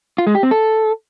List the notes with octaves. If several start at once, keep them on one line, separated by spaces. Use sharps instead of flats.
F4
G#3
G4
C4
A4